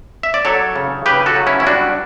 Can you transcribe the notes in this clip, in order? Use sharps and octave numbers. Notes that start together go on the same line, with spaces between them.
E5
D5
F#3 A4 C#5
C#3
C#3 G4 B4
F#4 A4
F#3
C#4 E4
E4
G3 D4 F#4